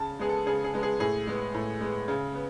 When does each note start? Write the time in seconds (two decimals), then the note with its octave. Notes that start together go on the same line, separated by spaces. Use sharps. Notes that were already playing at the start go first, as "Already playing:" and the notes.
Already playing: C#3 A5
0.19 G#3 B3 G#4
0.29 A4
0.46 C#3 G#4
0.64 G#4
0.74 G#3 B3
0.83 G#4
1.00 A2 G#4
1.27 G#3 B3
1.54 A2
1.81 G#3 B3
2.08 C#3
2.35 B3